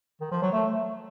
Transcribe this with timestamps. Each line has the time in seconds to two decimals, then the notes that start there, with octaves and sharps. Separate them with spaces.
0.21 D#3
0.31 F3
0.42 F#3
0.53 A3